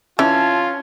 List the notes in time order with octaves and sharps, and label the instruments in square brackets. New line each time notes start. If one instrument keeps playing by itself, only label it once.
[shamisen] E3 [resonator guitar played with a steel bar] C#4 [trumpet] F4 [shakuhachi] A5